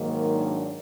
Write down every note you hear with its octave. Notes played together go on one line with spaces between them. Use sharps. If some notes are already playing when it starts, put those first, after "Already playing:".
Already playing: G#2 D#3 F#3 A#3
D4